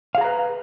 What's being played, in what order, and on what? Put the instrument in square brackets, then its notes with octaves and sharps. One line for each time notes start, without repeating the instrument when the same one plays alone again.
[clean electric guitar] F5
G#4
A#5
B4